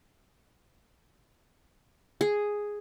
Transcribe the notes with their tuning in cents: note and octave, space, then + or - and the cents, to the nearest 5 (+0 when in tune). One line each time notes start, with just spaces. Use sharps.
G#4 +0